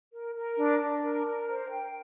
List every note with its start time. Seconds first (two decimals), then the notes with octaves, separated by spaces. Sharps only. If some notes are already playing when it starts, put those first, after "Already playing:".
0.13 A#4
0.35 A#4
0.58 D4
0.80 D4
1.03 A#4
1.26 A#4
1.48 C5
1.71 G5